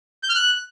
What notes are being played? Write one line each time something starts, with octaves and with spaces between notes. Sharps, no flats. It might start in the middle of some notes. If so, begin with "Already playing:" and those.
G6
F6
F#6